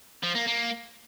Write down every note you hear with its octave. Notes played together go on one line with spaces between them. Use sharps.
F3
A#3
A#3